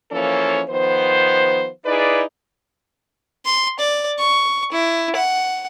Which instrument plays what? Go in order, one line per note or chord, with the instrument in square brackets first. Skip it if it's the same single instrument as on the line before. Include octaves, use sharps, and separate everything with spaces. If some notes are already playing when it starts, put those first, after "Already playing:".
[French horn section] E3 F3 A#3 C#4 A4 C#5
D#3 F3 B3 C5
D#4 E4 G#4 B4 D5
[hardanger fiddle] C6
D5
C#6
E4
F#5